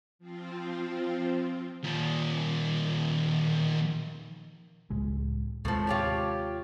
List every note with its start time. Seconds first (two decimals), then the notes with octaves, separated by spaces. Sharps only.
0.19 F3 C4 F4
1.84 D#2 A#2
4.90 C#2 A2 G#3
5.65 D#2 A2 C3 F3 G#3
5.87 F4 G4 C#5